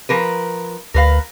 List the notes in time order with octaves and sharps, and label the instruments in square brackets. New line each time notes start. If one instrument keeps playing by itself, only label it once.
[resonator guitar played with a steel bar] F3 A#4 B4
[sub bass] D2 [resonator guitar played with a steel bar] A#4 B4 F5